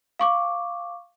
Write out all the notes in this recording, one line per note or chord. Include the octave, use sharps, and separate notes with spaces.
F5 C#6 D6